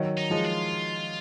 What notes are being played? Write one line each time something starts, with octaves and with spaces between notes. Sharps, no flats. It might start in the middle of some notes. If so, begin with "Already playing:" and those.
Already playing: D#3 F#3
D#4
F3 G#3
F4